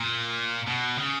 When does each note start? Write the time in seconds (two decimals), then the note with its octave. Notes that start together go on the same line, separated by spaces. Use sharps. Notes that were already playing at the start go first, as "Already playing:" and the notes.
Already playing: A#2
0.68 B2
0.98 C#3